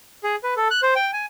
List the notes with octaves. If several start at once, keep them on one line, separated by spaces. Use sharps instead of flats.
G#4
B4
A4
F#6
C5
G5
G#5